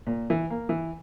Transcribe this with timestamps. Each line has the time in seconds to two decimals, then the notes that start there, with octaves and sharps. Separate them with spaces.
0.07 A#2
0.30 E3
0.50 A#3
0.69 E3